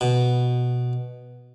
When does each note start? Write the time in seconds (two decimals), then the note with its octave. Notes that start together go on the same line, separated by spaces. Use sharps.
0.01 B2